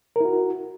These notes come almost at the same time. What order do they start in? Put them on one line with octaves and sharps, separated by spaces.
A#4 E4 F#4